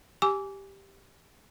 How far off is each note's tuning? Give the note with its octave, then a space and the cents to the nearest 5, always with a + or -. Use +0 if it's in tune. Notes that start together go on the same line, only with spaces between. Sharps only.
G4 +0 G#5 +0 D6 -25